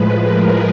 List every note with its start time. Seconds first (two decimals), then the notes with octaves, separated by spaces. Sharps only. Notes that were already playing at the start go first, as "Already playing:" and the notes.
Already playing: A2 F3 G#3 B4
0.21 A#4